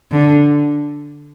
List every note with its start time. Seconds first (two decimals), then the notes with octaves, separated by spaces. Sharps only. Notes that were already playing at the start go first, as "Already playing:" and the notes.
0.12 D3